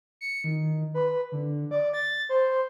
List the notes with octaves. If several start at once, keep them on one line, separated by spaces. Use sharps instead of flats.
C#7
D#3
B4
D3
D5
A6
C5